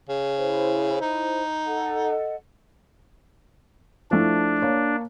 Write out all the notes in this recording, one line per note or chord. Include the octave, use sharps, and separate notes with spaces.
C#3
E4 C5
D#4
A4 D#5 F#5
F3 A3 D4 E4
A#3 C#5